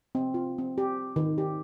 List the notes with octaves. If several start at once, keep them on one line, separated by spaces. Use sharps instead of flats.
C4
F4
C4
G4
D#3
G4